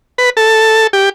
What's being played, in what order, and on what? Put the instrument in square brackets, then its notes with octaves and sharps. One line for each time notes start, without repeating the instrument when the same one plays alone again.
[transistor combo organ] B4
A4
G4